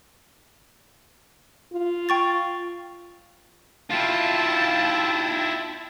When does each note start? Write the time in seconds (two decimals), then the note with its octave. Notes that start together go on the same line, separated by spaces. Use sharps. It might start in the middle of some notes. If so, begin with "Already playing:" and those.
1.73 F4
2.09 G5 C#6 A6
3.91 E4 F4 G5 A5